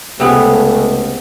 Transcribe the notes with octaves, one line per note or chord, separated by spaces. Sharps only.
C#2 C3 A3 B3 G#4